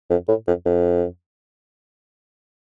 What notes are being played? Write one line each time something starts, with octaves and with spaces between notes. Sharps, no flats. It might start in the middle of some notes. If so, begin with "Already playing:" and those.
F2
A2
F2
F2